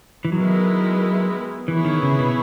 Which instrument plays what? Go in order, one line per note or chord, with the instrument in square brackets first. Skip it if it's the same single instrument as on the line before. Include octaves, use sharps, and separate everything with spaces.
[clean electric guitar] E3
[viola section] D#3 G#3 B3 E4 A#4 [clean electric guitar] F#3
[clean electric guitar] E3 [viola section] B3 E4 G#4 C#5
[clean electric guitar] D#3
C#3
B2